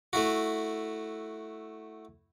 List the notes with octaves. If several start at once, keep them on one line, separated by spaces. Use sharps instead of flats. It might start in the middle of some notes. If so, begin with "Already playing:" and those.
A3 E4 F#4